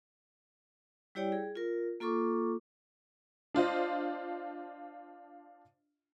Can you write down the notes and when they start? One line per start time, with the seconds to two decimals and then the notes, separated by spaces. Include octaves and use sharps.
1.15 G3 E4 G4 C#5 D5 G5
1.32 G#4
1.55 F4 A#4
2.00 A#3 F4 A4 C#6 D6
3.54 D4 F4 C5 D#5